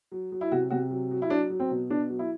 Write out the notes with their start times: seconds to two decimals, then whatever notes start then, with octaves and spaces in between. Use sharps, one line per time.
0.12 F#3
0.32 F#3
0.41 E4
0.51 C3 F#4
0.70 C3 F#4
0.90 F#3
1.11 F#3
1.22 E4
1.30 F#3 D4
1.50 F#3
1.60 C4
1.71 B2
1.90 B2 D4
2.10 F#3
2.19 E4